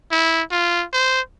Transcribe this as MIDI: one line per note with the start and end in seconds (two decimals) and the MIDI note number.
0.11 0.42 64
0.51 0.85 65
0.93 1.21 72